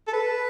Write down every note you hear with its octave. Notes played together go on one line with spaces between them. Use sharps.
A4
B4